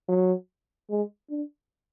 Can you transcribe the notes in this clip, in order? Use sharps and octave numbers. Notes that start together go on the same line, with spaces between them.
F#3
G#3
D4